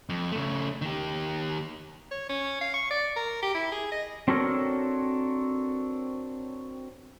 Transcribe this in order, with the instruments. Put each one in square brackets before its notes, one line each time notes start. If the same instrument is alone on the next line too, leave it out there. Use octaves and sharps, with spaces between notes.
[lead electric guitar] F2
C#3 A3
D#3 G4
[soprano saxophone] C#5
C#4
F5
C#6
D5
A#4
G4
E4
G#4
D#5
[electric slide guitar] C4 D4 F#4 A4 A#4 C#5